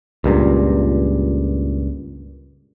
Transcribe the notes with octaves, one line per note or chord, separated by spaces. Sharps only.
C#2 G2 A#2